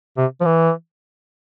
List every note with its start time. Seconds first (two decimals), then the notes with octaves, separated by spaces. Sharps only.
0.17 C3
0.41 F3
0.45 E3